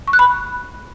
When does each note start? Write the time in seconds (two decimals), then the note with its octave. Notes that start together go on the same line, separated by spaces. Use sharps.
0.08 C#6
0.13 F#6
0.19 B5